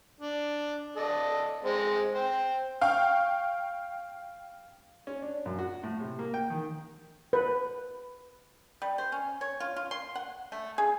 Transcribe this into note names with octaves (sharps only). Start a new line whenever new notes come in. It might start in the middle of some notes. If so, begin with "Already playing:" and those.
D4
A4 D5 D#5
G#3 C4
C5 G5
F5 G5 C#6
C#4
D4
F#2
F#4
A2
C3
A#3
G5
D#3
B4
G3
C5
C#4
C#5
F4
F4
C6
F#5
A3
G#4